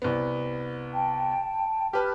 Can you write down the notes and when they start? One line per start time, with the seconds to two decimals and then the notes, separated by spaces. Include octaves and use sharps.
0.02 C2 B3
0.93 G5 A5
1.93 G4 B4 A5 F6